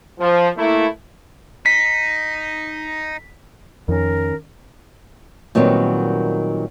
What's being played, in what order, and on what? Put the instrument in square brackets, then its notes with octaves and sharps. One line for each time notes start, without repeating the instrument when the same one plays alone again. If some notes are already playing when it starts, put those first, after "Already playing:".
[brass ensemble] F3
A3 A#3 E4
[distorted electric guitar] D#4 [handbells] B6
[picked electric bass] F2 [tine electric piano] D#3 C#4 [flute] A#4
[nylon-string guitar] A#2 D#3 F#3 G3 B3 C4